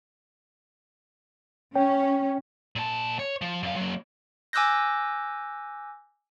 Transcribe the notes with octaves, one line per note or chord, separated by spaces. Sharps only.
C#4 C#5 G5
A#2 A5
C#5
F3
F#2 F5
F#3 A#3
G#5 D6 E6 F#6 G6 A#6